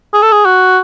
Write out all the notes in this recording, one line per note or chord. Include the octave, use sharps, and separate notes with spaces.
G#4
A4
G#4
F#4